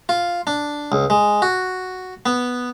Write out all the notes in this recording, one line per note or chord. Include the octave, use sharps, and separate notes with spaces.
F4
D4
C#2
G#3
F#4
B3